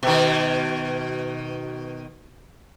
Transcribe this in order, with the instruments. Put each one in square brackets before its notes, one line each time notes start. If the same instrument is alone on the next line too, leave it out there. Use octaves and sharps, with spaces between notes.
[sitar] B2 D#3